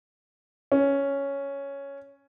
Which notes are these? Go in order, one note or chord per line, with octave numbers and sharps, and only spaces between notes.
C#4